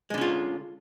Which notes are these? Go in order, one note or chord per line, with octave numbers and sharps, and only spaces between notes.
D3 G#3 C#4 F4